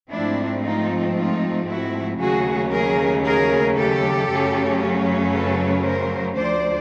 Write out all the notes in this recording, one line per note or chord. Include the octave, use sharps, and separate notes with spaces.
G#2 F3 A3 C4 D4 E4
D#4 F4
D#4 F4
E4 F#4
D#2 C#3 F#3 A3 C#4 F#4 G#4
G#4 A#4
G#4 A#4
G4 A4
F#2 C#3 F#3 A3 C#4
A4 B4
A#4 C5
D2 D3 F3 C5 D5